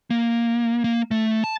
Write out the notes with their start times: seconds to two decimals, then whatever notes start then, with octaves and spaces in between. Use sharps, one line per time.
0.10 A#3
0.84 A#3
1.11 A3
1.44 A5